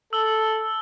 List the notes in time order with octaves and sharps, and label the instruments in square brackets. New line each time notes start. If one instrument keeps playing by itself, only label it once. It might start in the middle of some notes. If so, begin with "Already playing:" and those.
[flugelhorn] A4 [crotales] E6 G7